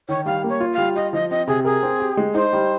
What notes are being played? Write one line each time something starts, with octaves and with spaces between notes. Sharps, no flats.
D#3 C#5
G3 F5
A#3
C#5
F4
G3 F5
F4 D#5
F3 D#5
C4 D#5
C3 G#4
G#4 A#4
C4
G4
G#3
D#4 C5
G3